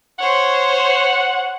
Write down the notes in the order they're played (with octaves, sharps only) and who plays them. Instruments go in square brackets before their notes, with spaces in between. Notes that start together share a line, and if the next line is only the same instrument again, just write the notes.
[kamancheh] C5 C#5 [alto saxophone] F#5